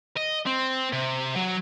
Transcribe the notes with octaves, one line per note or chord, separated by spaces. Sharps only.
D#5
C4
C3
F#3